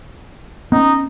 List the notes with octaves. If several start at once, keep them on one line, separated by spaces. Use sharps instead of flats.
B3 C#4 D#4